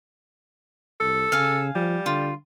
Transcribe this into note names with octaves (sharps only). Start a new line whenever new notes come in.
C2 A4
C#3 F5 G#5
F3 G3
D3 F4